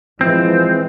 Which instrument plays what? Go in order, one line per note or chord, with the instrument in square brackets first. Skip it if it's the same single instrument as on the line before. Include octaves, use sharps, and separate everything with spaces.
[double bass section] E3 G#3 [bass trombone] F3 [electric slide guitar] C4